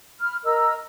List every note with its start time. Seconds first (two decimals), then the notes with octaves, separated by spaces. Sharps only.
0.20 B5 F6
0.44 A#4 D#5 A#5 E6